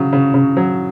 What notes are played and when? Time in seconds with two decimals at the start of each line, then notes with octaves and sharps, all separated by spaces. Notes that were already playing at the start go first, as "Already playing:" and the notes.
Already playing: C#3 F#3
0.13 C#3
0.34 C#3
0.57 F#3